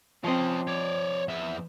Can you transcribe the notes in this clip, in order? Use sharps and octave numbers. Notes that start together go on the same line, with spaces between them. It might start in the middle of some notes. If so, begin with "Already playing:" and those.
F3 C4 C#4 D#5
C#5 D5
E2 E5